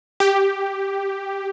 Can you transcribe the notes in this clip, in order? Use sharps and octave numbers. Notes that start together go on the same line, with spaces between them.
G4